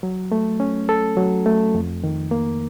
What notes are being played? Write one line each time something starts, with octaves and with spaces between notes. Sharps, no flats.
F#3
A3
C#4
A4
F#3
A3
F2
D#3
A#3